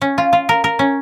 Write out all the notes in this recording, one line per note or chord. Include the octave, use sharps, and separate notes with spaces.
C#4
F4
F4
A#4
A#4
C#4